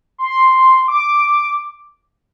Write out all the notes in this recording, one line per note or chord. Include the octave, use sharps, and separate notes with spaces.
C6
D6